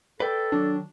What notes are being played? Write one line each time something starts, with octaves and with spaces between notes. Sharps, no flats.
A4 B4 D5 G5
D#3 F#3 D4